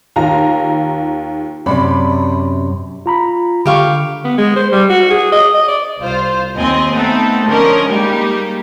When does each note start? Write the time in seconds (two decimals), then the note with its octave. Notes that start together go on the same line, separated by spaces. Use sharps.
0.16 D#2 F4 A#5
1.66 F#2 C3 D5 B5
3.06 F4 A#5 B5
3.66 D3 G4 F5 C#6
4.24 B3
4.38 G#3
4.56 C5
4.72 G3
4.90 F#4
5.10 G#4
5.32 D#5
5.54 D#5
5.68 D5
6.00 C2 F4 C5
6.55 D#2 C4 D#5 G#5
6.92 A3 B3 C4 D#4 A4
7.46 D3 F3 C#4 A#4 D#5
7.90 G3 G#3 A#3 D#4 G4